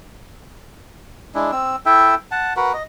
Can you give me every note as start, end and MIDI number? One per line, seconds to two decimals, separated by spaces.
1.35 1.51 56
1.35 1.51 62
1.35 1.51 64
1.52 1.76 60
1.52 1.76 88
1.86 2.15 64
1.86 2.15 69
1.86 2.15 76
1.86 2.15 79
2.31 2.53 78
2.31 2.53 81
2.57 2.73 66
2.57 2.73 70
2.57 2.73 71
2.57 2.73 78
2.74 2.83 75